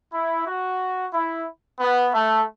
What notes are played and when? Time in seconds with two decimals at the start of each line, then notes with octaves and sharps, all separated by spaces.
0.13 E4
0.47 F#4
1.14 E4
1.80 B3
2.14 A3